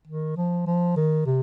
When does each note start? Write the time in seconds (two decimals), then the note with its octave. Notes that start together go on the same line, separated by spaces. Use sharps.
0.07 D#3
0.37 F3
0.67 F3
0.96 D#3
1.26 C3